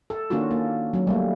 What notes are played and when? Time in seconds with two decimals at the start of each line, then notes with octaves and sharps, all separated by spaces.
0.10 A4
0.30 D#3 A#3 C#4 D4 F4 F#4
0.51 A#3
0.93 F#3 C#4
1.07 G3 A3 A#3